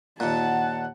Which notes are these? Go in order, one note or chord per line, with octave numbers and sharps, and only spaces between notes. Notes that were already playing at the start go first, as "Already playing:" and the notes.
D#2 A#2 F#5 A5